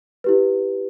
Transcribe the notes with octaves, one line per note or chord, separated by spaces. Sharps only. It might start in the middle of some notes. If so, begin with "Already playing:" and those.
E4 G4 B4